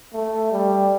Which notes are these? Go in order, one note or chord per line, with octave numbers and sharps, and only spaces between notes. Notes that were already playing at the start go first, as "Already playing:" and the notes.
A3
G3